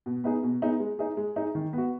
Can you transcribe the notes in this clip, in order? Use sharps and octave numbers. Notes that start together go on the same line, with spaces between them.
B2
B3 D#4 G#4
B2
B3 D#4 G#4
G#3
D#4 G#4
G#3
D#4 G#4
D#3
B3 F#4